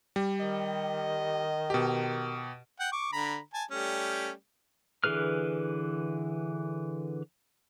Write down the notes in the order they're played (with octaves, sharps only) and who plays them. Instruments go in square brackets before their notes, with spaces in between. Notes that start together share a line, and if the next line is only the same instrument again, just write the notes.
[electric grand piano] G3
[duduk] D#3 [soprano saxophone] D#5
[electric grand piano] B2 G4
[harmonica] F#5 G5
C#6 D6
D3 A#5 B5
G#5 A5
G3 A3 C#4
[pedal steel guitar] D3 E3 G#4 B4 F6